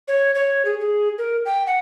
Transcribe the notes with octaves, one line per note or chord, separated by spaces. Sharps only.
C#5
C#5
G#4
G#4
A#4
G5
F#5